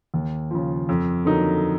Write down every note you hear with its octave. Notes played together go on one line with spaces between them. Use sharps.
D#2
C#3 F3
F2
D3 F#3 A#3 D#4